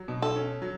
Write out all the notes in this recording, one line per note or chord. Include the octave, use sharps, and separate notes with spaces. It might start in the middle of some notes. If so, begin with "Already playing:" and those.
Already playing: F#3
B2
A4
C#4
F#3